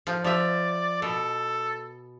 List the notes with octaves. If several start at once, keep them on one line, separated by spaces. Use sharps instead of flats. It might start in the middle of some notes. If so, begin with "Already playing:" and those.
F3
F3 D5 E5
B2 A4